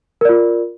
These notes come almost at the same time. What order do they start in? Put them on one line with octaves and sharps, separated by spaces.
A#4 D5 F4